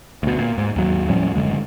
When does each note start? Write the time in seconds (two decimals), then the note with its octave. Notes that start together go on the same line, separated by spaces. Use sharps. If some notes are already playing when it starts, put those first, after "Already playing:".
0.23 D2 B2
0.39 A#2
0.58 G#2
0.76 D#2 F#3
1.10 A2 F3 G3 C#4
1.35 F#1 A#2 D3 G#3